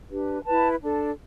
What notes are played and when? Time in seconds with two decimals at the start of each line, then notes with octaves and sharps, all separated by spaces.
0.10 D4 G4 B4
0.46 E4 B4 A5
0.81 D4 A4